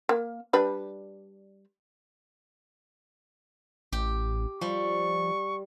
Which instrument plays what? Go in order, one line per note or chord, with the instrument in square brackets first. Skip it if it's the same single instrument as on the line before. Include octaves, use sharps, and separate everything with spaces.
[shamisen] A#3
G3 D4 B4
[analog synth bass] A1 [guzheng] G4
[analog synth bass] F3 [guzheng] G3 [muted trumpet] C#6